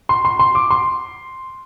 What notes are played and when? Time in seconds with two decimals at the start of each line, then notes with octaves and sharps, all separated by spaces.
0.09 C6
0.25 C6
0.39 C6
0.55 D6
0.71 C6